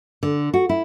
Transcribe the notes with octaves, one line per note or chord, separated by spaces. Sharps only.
D3
F#4
E4